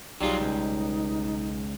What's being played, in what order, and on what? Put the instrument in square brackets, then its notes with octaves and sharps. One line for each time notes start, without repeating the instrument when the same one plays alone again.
[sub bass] B1 [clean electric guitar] F#3 F4 [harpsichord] G3 G#4 [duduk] D#4
[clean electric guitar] C#2